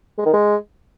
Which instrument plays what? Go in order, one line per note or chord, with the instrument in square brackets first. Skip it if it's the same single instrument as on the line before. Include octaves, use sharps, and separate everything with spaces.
[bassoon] G#3
D#3
G#3